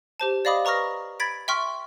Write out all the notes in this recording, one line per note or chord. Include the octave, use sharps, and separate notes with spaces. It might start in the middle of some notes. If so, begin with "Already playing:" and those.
G4 C5 A5
D5 D#5 F5 B5 D6 D#6
B4 A#5 C#6 D#6 F6 A#6
B5 G#6 A6 B6 D7
E5 G5 C6 C#6 F6